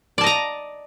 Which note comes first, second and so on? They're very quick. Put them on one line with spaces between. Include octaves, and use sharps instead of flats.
D5 A5 D#5 A#5